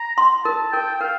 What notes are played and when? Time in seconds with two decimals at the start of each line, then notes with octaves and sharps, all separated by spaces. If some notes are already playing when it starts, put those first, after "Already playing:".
Already playing: A#5
0.18 C6
0.45 A#4 A5
0.72 A#4 G5
0.95 G5
1.01 A#4 F5